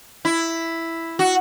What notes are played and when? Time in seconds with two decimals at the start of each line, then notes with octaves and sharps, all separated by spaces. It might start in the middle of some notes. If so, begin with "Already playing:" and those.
0.25 E4
1.19 F#4